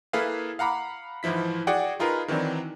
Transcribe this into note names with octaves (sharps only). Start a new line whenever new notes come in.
A#3 E4 G#4 A4 B4 F5
F5 F#5 A#5 B5 D6
G#2 E3 F3 E4 B6
F#4 G#4 D5 F#5 G5
D#4 F4 G#4 A#4 B4
D#3 E3 F#3 C4 D4